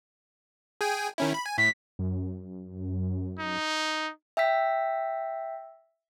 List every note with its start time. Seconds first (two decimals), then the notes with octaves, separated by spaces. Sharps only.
0.81 G#4 G5 G#5
1.18 D#3 C#4 E4
1.34 B5
1.46 G#5
1.58 A2 B6
1.99 F#2
3.39 D#4
4.37 E5 G5 E6 B6